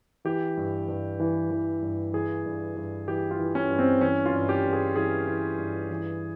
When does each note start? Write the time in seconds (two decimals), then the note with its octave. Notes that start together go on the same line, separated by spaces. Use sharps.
0.25 E3 G4
0.57 G2
0.88 G2
1.20 E3
1.51 E3
1.82 G2
2.13 E3 G#4
2.45 G2
2.76 G2
3.08 E3 G4
3.31 F4
3.39 E3
3.55 C#4
3.71 G2
3.79 C4
4.01 E3 C#4
4.26 F4
4.33 G2
4.49 G4
4.64 G2
4.73 G#4
4.96 E3 G#4
5.27 E3
5.59 G2
5.90 E3